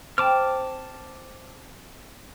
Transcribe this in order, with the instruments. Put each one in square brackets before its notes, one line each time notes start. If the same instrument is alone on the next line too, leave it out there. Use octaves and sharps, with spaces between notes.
[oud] C4 [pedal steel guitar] A5 D6 F6